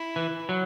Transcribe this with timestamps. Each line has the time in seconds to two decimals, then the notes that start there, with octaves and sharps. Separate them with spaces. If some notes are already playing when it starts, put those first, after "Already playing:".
Already playing: E4
0.16 E3
0.49 F#3